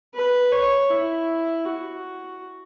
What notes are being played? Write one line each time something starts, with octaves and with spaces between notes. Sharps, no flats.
B4
C#5
E4
F#4